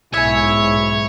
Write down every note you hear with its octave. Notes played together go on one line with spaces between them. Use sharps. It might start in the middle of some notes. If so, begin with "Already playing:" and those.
B1 G#2 E4 C#5 E5 G#5